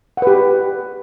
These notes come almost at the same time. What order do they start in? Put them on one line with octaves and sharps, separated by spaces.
F#5 B4 G4